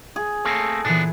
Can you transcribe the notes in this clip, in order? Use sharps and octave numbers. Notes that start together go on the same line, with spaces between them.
G#4
A3 A#3 C4 A4
A#2 E3 B3 D4